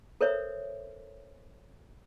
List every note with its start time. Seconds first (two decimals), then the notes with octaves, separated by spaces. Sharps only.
0.21 A4 A#4 C5 C#5 E5